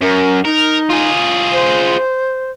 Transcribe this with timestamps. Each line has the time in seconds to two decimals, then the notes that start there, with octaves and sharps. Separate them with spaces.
0.02 F#2 A#4
0.45 D#4 A#4
0.90 F4 G#4
1.52 C5